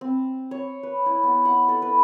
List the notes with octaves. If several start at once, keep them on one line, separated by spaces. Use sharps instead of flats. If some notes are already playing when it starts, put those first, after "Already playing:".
C4
C#5
B4
E4
B3
F#5
A4
B4